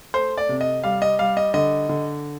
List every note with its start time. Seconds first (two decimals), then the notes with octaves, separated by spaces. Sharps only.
0.14 A3 C5
0.37 D5
0.49 C3
0.61 D#5
0.84 G3 F5
1.02 D#5
1.19 G3 F5
1.37 D#5
1.54 D3 D#5
1.89 D3